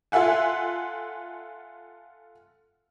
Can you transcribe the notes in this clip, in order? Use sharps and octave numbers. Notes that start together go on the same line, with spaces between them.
F4 A4 E5 F#5 G#5